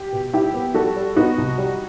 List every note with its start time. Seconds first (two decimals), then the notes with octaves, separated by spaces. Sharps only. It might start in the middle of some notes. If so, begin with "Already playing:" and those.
Already playing: G4
0.12 B2
0.33 G3 E4 G4
0.54 B3
0.74 G3 F#4 A4
0.96 G3
1.16 B3 D#4 F#4
1.38 C2
1.58 G3